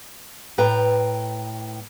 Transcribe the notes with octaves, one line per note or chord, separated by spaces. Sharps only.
A2 B4 G5 A#5